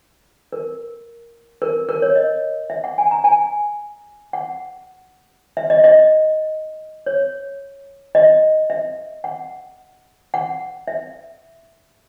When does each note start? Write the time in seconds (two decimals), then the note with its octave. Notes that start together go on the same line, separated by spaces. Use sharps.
0.53 A#4
1.62 A#4
1.89 A#4
2.02 C#5
2.16 D#5
2.70 E5
2.84 F#5
2.98 G#5
3.11 A#5
3.24 G#5
4.33 F#5
5.57 E5
5.70 D#5
5.84 D#5
7.06 C#5
8.15 D#5
8.70 E5
9.24 F#5
10.34 F#5
10.88 E5